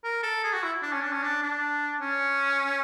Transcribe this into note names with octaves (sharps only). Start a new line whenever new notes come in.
A#4
A4
G#4
F#4
E4
D4
C#4
D4
C#4
D4
D4
C#4